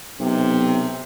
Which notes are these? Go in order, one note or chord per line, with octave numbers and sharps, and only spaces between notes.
B1 C3